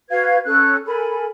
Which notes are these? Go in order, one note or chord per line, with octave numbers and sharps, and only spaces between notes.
F#4 B4 F5 G#6
C#4 A4 F#6
A4 A#4 G#5 B5